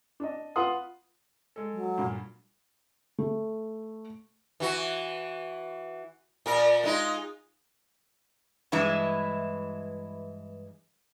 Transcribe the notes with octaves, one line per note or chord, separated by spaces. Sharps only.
D4 D#5
F4 B4 F5 F#5 C6 D#6
G#3 A4
F#3
G2 A#2
A3
E3 F#4
A#2 A#4
G#3 D#4 F4
G2 E3 G#3 E4